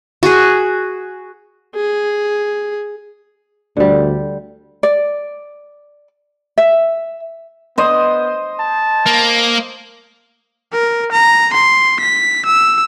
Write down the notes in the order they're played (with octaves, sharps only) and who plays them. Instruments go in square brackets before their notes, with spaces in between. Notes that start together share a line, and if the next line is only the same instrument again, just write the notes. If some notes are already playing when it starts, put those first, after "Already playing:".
[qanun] F#4 G#4
[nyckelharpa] G#4
[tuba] D2 [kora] D3 G3
[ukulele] D5
E5
[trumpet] B3 [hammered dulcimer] C5 D#5
[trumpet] A5
[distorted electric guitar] A#3
[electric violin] A#4
A#5
C6
B6
E6